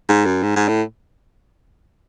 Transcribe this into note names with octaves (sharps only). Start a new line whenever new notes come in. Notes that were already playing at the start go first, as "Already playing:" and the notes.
G#2
F#2
G#2
G#2
A2